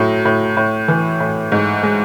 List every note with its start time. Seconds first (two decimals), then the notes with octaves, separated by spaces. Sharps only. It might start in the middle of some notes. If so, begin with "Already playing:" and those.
Already playing: A2 F#3
0.25 A2
0.57 A2
0.88 E3
1.20 A2
1.52 G#2
1.83 G#3